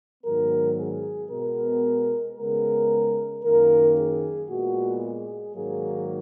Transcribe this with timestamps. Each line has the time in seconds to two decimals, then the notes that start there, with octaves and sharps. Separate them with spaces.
0.24 G#2 D#3 F#3 B3 A#4
0.77 G#4
1.30 B2 G#3 B3 A#4
2.37 C#3 G#3 B3 A#4
3.43 F#2 D#3 A#3 A#4
3.96 G#4
4.49 A#2 G#3 B3 F#4
5.03 G#4
5.55 G#2 D#3 F#3 A#3 G#4